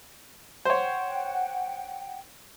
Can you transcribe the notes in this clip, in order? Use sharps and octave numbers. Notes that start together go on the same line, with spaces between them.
C5 C#5 F#5 G5